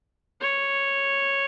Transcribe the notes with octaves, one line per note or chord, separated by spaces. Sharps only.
C#5